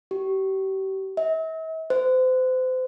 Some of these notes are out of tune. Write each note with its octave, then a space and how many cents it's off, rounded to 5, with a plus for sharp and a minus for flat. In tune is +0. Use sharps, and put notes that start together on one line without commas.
G4 -35
E5 -45
C5 -35